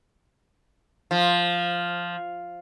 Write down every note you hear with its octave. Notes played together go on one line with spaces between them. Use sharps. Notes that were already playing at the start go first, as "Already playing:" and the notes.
F3